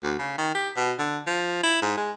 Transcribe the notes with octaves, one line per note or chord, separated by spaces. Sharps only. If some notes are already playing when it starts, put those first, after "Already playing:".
D2
C#3
D#3
G4
B2
D3
F3
E4
G#2
G#3